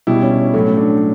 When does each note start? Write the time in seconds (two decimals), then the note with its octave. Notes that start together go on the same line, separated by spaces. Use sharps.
0.07 B2 G3 E4
0.22 C#4
0.54 A2 F#3 A3 C#4
0.77 D4